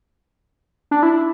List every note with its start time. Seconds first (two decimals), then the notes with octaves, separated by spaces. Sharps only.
0.91 D4
1.03 E4